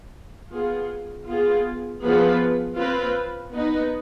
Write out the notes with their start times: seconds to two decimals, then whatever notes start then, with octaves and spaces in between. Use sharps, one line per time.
0.51 B3 F4 G#4
1.27 B3 F4 G#4
2.01 F3 B3 F4 G#4 B4
2.76 C4 F4 B4
3.52 B3 D#4 B4